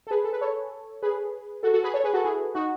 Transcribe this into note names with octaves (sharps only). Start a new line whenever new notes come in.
A4
G#4 B4
A4
B4
A4 C#5
G#4 B4
F#4 A4
F#4 A4
G#4 B4
A4 C#5
G#4 B4
F#4 A4
E4 G#4
D#4 F#4